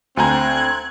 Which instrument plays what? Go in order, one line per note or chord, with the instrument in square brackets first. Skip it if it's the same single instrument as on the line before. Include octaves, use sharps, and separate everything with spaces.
[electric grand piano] D2 G#5 A#5 [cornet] C4 [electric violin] F#6 G#6